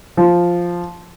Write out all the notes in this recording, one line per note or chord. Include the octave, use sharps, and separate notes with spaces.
F3